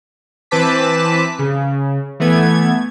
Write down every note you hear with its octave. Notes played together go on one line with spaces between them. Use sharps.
E3 C4 B4 A5 D6 B6
C#3
E3 A3 B3 G#6